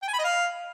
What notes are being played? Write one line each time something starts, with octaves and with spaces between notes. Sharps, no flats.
G5
G#5
B5
D#5
F5